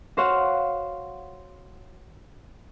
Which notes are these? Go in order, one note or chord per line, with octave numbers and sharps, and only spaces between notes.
F#4 C5 C#5 F5 F#5